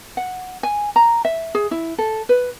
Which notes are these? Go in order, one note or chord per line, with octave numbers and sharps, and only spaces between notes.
F#5
G#5
A#5
E5
G#4
E4
A4
B4